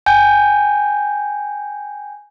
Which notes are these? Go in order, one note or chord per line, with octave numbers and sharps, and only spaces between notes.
G5 G#5 G6